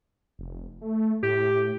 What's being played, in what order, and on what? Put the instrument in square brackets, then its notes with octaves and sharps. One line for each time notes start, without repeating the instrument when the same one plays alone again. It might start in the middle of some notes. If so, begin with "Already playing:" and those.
[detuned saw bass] F1
A3
[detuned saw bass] A2 [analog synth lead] G4